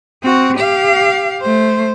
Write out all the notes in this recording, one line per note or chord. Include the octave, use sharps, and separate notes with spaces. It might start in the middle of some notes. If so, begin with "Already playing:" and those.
C4 F#4
G4 F5
A3 C5